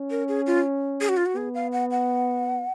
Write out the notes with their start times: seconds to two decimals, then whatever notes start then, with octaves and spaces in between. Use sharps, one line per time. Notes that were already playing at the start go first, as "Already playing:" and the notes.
Already playing: C#4
0.11 A#4
0.28 G#4
0.47 F4
1.01 G#4
1.09 F#4
1.17 F4
1.26 F#4
1.36 B3 G#4
1.54 F5
1.72 F#5
1.91 F#5